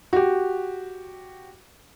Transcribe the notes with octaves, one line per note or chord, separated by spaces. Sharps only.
F#4 G4